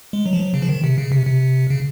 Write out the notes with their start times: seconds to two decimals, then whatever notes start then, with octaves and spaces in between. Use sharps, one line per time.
0.13 G#3
0.26 F#3
0.33 F3
0.40 F#3
0.54 C#3
0.62 F3
0.69 D#3
0.84 C3
0.98 C#3
1.12 C3
1.27 C3
1.70 C#3